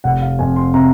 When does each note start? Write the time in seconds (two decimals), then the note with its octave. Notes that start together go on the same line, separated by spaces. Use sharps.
0.04 F1 F#5
0.22 F5
0.39 F2 G#5
0.56 C6
0.74 C3 A#5